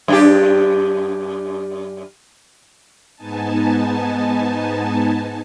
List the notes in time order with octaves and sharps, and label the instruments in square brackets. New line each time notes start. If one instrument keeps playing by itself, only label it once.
[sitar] F#2 D4 G4
[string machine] G#2 B3 D#4 G#5 A5